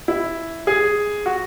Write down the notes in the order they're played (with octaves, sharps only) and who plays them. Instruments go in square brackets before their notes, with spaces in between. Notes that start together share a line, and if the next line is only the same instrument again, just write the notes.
[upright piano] E4
G#4
F#4